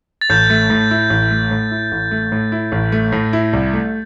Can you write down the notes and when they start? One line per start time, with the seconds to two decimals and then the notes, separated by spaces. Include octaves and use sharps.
0.21 A6
0.30 A1 G6
0.50 A3
0.70 A2
0.91 E4
1.10 A1
1.31 A3
1.51 A2
1.71 E4
1.92 A1
2.11 A3
2.32 A2
2.52 E4
2.72 A1
2.92 A3
3.12 A2
3.33 E4
3.53 C2
3.73 A3